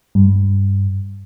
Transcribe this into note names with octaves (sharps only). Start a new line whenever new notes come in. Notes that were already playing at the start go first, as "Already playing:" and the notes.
G2